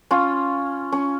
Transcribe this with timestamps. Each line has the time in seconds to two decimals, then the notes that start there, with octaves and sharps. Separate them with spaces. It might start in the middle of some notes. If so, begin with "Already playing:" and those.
0.11 C#4 F4
0.92 C#4